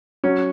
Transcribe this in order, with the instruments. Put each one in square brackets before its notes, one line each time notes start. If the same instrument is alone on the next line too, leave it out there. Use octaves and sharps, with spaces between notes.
[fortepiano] F#3 C#4